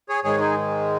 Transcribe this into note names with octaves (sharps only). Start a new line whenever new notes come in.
G#4 C#5
G#2 D#3 G#3 G#4 C#5
D#4 G#4